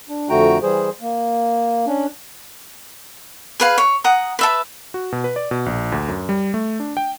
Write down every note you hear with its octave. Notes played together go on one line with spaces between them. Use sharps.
D4
F2 D3 A3 F#4 G5 A#5
E3 G3 G#4 C5
A#3
C#4 D4
G#4 B4 F5
C#5
F#5 A#5 D#6
B4 E5 A5
F#4
B2
B4
D5
B2
A#1
D2
F#2
G3
A3
D4
G5